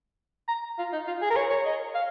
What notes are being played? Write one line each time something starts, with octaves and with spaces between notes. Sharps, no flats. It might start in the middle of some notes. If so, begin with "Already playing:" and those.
A#5
F4
D#4
F4
G#4
A#4
C#5
C#5
D#5
F5